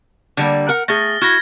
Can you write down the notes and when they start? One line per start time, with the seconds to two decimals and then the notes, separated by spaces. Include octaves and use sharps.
0.37 D3 G3 A#3
0.69 A#4 F#5
0.88 A3 G#4 F6 A6 A#6
1.21 E4 F#4 F6 G#6 A#6